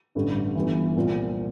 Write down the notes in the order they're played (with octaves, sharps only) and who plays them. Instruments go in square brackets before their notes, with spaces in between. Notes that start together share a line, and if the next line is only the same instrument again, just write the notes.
[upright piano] A1 G2 D3 A3
G1 G2 E3
C2 A#2 F3